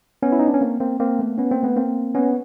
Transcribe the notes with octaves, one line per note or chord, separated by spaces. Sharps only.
B3 C#4
E4
D#4
D4
C#4
A#3 C4
A#3 C4
A#3 C4
A3 B3
B3 C#4
A#3 C4
A3 B3
A#3 C4
B3 C#4